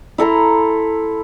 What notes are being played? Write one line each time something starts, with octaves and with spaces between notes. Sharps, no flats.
E4 A4 A#5 C6